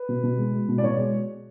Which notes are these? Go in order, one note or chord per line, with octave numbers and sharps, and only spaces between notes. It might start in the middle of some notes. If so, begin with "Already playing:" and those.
Already playing: B4
B2
B2
G#3
G#3
B2
D5
B2 C#5
G#3